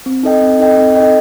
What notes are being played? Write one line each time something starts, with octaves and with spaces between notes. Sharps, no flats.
C4
D#4 A4 D#5 G5
C4
D#4 A4 D#5 G5
C4
D#4 A4 D#5 G5